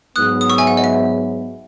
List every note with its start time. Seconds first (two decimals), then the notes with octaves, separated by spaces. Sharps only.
0.15 G#2 F#3 B3 D#6 F#6
0.41 D#6
0.50 C#6 E6
0.58 E5 G#5
0.67 F#5
0.77 D#5
0.84 E5